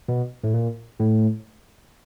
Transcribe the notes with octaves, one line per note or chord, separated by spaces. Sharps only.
B2
A2
A#2
A2